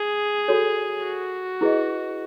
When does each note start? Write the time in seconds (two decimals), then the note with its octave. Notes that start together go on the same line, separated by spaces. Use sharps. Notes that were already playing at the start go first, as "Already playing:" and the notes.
Already playing: G#4
0.48 F#4 A4 C#5
1.04 F#4
1.61 E4 G#4 B4 D#5